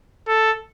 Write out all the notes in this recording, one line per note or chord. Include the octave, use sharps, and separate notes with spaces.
A4